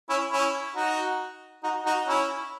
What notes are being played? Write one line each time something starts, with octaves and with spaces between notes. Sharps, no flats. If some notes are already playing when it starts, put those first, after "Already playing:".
C#4 E4
C#4 E4
D#4 F#4
D#4 F#4
D#4 F#4
C#4 E4